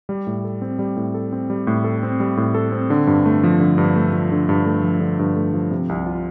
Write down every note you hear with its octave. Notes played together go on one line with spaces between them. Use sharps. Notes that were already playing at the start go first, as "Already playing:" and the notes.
G3
A2
A4
C4
G3
A2
A4
C4
G3
A2
A4
C4
G3
A2
A4
C4
D3
G2
A3
F3
D3
G2
A3
F3
D3
G2
A3
F3
D3
G2
A3
F3
C3
C2
F4